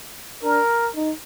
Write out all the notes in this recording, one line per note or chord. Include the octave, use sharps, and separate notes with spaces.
D4 A#4
D#4